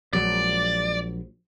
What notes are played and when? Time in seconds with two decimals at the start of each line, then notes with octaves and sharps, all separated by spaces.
0.13 A#1 F#3 G#3 D5